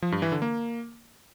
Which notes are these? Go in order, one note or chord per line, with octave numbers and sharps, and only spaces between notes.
F3
G2
E3
D3
A#3